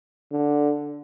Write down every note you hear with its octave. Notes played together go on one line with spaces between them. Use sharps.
D3